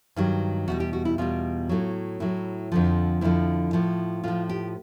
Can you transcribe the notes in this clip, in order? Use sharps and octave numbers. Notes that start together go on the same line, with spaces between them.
G2 D#3 F#3
E2 B2 G3 F#4
G4
F#4
E4
E2 B2 G3 F4
A2 F#3
A2 F#3 E4
F2 D3 F3
F2 D3 F3 E4
A2 F3
A2 F3 F4
G4